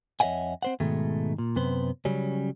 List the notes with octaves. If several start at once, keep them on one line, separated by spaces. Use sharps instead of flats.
F2 C#5 D#5 E5 F#5 G#5
C4 C5 F#5
G#2 B2 D#3 G#3 A3
A#2
F#2 C3 B3 B4 C5
C#3 F#3 G3 C#4